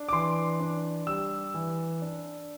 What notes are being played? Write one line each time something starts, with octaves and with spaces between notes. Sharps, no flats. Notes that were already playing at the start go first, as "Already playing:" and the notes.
Already playing: D4
D6
E3 C6
D4
G3 E6
E3
D4